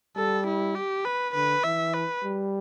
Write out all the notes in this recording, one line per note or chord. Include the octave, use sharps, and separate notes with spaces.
G3 A4
E4
G4
B4
D3 B4
E3 E5
B4
G3